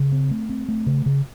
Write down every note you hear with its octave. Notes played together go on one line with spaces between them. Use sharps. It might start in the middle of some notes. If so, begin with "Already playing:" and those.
Already playing: C#3
C4
A3
C4
A3
C#3
C#3